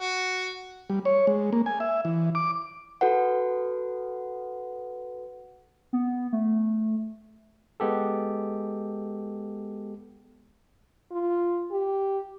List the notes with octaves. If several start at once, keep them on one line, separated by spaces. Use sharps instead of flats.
F#4
G3
C#5
G#3
A#3
G#5
E5
E3
D6
F#4 A4 B4 F#5
B3
A3
G#3 B3 G4 A4
F4
G4